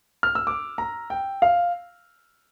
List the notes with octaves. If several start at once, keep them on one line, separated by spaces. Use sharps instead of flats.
F6
E6
D6
A#5
G5
F5